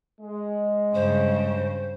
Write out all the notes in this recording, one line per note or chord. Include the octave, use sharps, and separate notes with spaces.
G#3
G2 C#3 C5